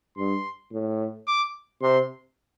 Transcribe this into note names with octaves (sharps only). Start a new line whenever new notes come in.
G2 C6
A2
D6
C3 C6